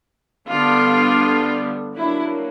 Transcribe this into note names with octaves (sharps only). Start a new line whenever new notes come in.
D3 G3 B3 D4 F4
F#3 A#3 D4 E4